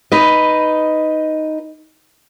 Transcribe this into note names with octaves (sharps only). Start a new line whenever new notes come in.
D#4 B4 D#5